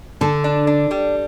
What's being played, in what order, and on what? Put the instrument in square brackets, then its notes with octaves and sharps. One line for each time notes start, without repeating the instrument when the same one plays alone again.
[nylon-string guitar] D3 [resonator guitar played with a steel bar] A4
[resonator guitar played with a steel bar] D4
D4
G3